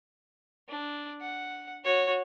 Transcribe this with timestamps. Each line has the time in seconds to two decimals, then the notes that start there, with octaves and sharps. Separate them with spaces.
0.69 D4
1.21 F#5
1.84 F#4 C#5